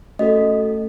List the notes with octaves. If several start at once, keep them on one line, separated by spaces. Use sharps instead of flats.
A3 C#4 F#4 A4 D#5